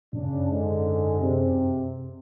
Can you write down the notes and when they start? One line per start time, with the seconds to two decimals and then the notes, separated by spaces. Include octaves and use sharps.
0.13 F#2 C#3 D4
0.49 G#2 D3 G#3
1.19 C3